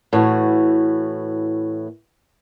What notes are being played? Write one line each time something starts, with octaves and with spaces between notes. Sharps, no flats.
A2 E3 F#4